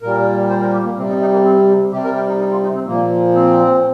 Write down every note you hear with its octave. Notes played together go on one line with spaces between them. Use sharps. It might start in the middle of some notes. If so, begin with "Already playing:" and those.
A#2 G3 A#4
C5
A#4
G4
A#3
C3 G3 C4
D#4
D#4
A#3
C4
C3 G3 G4
A#4
G4
D#4
D#4
F4
D#4
C4
A#2 F3 A#3
C4